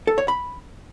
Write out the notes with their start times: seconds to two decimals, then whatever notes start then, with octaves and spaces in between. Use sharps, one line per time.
0.07 A4
0.18 C#5
0.28 B5